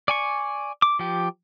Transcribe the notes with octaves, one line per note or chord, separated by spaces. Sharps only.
D5 G#5 C#6
D6
F3 G4